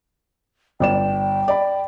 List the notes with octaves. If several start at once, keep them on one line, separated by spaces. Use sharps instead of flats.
G1 D5 G5 E7
D5 B5